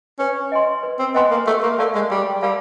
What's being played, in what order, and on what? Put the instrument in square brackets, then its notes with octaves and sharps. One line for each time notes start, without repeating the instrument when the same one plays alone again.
[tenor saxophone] C#4 [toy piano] B4
[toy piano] D#5 G#5 C6
B4
[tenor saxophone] C4
[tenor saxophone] B3 [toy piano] D#5 G#5 C6
[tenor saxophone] A#3
[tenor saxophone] A3 [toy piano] G4
[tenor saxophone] A#3
[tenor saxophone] A3 [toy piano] A#4 D5 F5 A5
[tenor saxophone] G#3
[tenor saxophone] G3 [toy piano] G4
[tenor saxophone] G3 [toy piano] A#4 D5 F5 A5